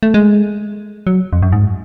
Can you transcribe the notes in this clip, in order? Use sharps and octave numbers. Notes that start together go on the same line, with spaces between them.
A3
G#3
F#3
F2
F#2
G#2